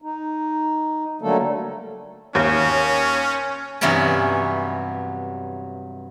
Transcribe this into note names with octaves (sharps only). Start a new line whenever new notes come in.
D#4
D3 F#3 G3 A3 A#3 A4
D#2 C#4
G2 C3 E3 F#3 B3 C#4